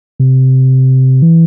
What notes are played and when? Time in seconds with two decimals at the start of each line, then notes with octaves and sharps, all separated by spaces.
0.20 C3
1.22 E3